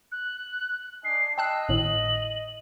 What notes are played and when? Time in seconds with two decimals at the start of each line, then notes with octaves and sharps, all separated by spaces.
0.11 F#6
1.04 D4 D#5 G#5 C7
1.38 D#5 G5 A5 E6 F#6
1.69 G#1 A2 F#7